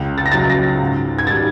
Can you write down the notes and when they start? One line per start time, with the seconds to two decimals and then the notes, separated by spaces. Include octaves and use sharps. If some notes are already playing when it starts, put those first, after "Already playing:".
Already playing: C#2
0.18 A6
0.26 A#6
0.32 C#3 F#3 A6
0.50 A#6
0.80 G#2
1.19 G#6
1.27 D#3 G3 A6